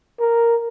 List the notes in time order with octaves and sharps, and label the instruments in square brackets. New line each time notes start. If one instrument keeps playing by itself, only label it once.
[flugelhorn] A#4